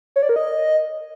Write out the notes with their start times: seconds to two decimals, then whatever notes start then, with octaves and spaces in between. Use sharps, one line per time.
0.16 C#5
0.23 D5
0.29 A#4
0.36 D#5